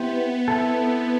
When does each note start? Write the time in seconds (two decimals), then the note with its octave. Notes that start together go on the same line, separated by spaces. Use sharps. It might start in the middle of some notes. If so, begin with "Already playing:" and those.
Already playing: B3 C4 E4 G4
0.48 C4 E4 A4